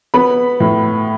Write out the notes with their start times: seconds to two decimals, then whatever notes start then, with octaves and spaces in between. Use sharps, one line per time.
0.14 B3 B5
0.60 A2